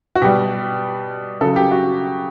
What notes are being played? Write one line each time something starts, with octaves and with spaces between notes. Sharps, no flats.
F#4
B2 G3 G4
C#3 F#3 A4
G4
F#4